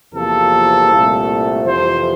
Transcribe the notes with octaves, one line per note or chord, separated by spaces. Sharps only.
E2 C3 F3 A#3 A4
C2 A#2 A3
F2 C3 E3 C5